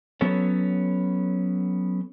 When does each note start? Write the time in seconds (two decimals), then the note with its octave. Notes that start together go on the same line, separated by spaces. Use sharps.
0.21 F#3 B3 C#4 A4 C#5